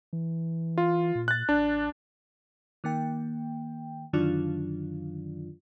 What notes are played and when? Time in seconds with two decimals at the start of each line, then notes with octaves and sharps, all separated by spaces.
0.13 E3
0.78 F4
1.15 A#2
1.28 F#6 A6
1.49 A1 D4
2.84 D#3 A#3 G5
4.13 F#2 D3 D#3 F#3 D4 F4